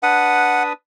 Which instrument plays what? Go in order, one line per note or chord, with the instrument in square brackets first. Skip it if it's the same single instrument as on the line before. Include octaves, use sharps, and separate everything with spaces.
[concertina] D4 B4 D#6 [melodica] F#5